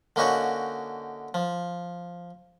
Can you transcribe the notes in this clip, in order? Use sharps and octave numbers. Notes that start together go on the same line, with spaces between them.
D3 A#3 C#4 D#4 F#4
F3